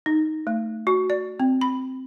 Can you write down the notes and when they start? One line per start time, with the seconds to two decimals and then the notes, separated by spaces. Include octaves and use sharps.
0.06 D#4
0.47 A3
0.87 F#4
1.10 D5
1.40 C4
1.61 B5